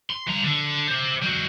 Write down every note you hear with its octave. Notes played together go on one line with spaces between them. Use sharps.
C6
G2 A#5
D3
G4 C5
G3 F#4